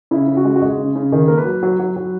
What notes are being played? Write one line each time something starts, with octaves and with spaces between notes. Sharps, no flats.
C#3 E4
C#3
F#4
G#3
F#4
G#3 G#4
C#3
C#3
D#3 G#4
A#3 A#4
B4
F#3
F#3
F#3
F#3